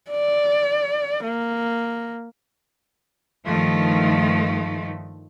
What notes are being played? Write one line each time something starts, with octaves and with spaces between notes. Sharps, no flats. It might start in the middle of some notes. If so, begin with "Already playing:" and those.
D5
A#3
G2 D#3 F3 A3